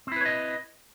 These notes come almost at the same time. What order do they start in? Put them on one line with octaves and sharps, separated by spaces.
C4 E4 B4 C#5 D#5